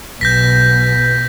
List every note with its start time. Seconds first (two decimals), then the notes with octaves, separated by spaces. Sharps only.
0.21 B1 B2 G6 A#6 B6